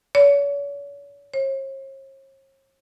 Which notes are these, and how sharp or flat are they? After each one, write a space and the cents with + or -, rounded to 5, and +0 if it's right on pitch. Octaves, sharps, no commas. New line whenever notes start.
C#5 +40
C#5 -45